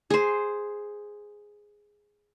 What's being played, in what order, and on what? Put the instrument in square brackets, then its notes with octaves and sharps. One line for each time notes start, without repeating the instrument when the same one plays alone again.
[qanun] G#4 C5